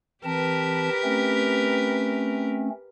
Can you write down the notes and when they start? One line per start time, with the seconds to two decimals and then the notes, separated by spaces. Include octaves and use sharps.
0.24 E3 C4 G4 A#4 B4 A5
1.04 A3 C4 C#4